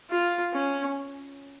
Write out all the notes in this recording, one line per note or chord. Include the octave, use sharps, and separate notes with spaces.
F4
C#4